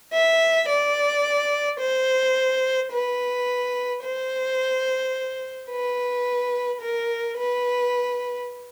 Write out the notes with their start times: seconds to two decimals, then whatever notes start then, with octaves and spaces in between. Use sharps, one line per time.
0.13 E5
0.68 D5
1.80 C5
2.92 B4
4.03 C5
5.70 B4
6.81 A#4
7.37 B4